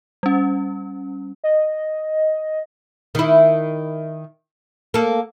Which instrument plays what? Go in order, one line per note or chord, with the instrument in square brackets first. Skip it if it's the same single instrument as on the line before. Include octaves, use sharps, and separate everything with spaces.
[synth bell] G3 C#4
[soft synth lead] D#5
[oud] D#3 E4
A#3 A4